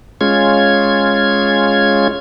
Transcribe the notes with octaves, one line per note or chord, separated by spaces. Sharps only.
G#3 C#4 F4 G#6